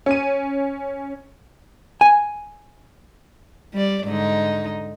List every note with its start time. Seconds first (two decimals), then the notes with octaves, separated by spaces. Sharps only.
0.06 C#4 D#7
2.01 G#5
3.73 G3 D5
4.05 G#2 D3 D#4